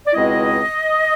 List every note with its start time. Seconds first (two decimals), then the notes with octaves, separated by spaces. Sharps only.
0.06 D5
0.13 C#2 B2 G#3 C4 E4 D#5